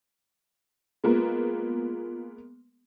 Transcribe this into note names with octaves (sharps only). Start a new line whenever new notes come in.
G#3 A#3 B3 F4